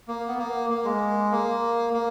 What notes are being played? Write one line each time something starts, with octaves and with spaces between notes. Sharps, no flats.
A#3
B3
A#3
A#3
G#3
A#3
A#3